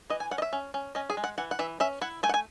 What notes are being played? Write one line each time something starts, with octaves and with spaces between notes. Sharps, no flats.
E3 D#5
G#5
C#4 F#5
D#5
E5
C#4
C#4
C#4 D#5
G#4
G#3
F#5
E3 F#5
F#5
E3 E5
C#4 E5
E4 F#5
A3 G#5
F#5
G#5